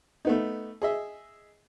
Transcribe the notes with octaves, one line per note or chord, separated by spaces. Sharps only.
A3 B3 D#4
G#4 D#5 E5